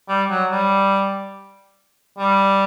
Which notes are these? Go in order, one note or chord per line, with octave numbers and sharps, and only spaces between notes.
G3
F#3
G3
G3